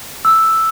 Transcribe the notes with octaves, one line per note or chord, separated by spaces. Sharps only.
E6